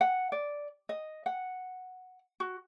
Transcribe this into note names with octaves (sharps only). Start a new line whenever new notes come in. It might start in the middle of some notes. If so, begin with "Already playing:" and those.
F#5
D5
D#5
F#5
F#4